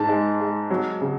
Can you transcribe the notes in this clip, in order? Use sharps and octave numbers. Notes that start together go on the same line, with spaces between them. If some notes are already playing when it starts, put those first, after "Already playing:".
Already playing: G#2 A5
G#3
G#3
F#3
C#3